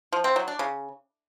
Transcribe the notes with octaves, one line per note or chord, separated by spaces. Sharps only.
F3
C4
F#3
D4
C#3